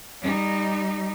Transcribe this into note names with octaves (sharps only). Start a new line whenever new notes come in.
G3 D#4